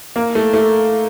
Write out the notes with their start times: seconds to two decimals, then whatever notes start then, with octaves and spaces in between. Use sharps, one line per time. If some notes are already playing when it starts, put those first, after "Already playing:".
0.16 A#3
0.35 A3
0.54 A3